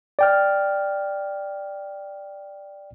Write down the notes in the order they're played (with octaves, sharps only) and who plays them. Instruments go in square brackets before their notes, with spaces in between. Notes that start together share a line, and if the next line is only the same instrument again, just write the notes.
[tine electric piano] D5 G5 F6